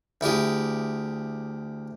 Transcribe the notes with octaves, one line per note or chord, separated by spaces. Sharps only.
D2 E4 G4 G#4